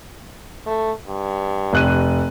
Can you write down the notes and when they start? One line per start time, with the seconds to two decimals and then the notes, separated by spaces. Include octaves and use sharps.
0.66 A3
1.07 G2
1.73 F1 F#6 D#7